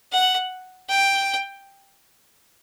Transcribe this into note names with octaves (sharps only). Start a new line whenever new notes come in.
F#5
G5